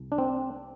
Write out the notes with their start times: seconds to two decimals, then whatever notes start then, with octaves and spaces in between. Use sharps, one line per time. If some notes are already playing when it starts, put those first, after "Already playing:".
Already playing: C2
0.12 D4
0.18 C4